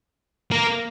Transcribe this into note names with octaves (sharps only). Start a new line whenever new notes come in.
A#3